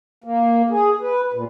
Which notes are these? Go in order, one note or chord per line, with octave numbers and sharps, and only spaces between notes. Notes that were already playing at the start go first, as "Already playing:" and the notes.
A#3
G#4
B4
A#2